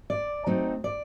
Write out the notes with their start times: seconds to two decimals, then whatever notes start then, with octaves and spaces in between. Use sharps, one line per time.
0.10 D5
0.47 F#3 A3 C4 D#4
0.84 D5